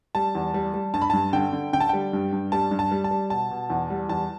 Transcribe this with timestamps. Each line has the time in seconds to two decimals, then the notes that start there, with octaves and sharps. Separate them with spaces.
0.15 G3 A5
0.35 E2
0.54 G3
0.74 G3
0.94 G2 A5
1.02 B5
1.10 G2 A5
1.33 D3 G5
1.53 D3
1.73 D3 G5
1.80 A5
1.89 G3 G5
2.13 G2
2.32 G2
2.52 G3 A5
2.71 G2
2.79 A5
2.91 G3
3.04 A5
3.11 G3
3.30 B2 A5
3.51 B2
3.70 E2
3.90 G3
4.09 E2 A5